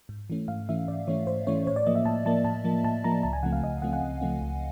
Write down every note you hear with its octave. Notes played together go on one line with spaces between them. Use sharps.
G#2
E3 A3 C#4
G#2 F5
E3 A3 C#4 E5
G#2 D5
E3 A3 C#4 C#5
G#2 C5
E3 A3 C#4 C#5
A2 C#5
D5
F3 A#3 D#5
E5
A2 A5
F3 A#3 A5
A2 A5
F3 A#3
A2 A5
F3 A#3 A#5
C#2 A5
G#5
C#3 F3 A3 C4 F#5
F5
C#2 D#5
C#3 F3 A3 C4 F#5
F#5
C#2
C#3 F3 A3 C4
C#2